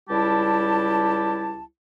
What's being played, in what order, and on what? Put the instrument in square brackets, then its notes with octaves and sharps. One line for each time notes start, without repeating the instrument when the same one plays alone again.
[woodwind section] C#2 G3 E4 G4 A5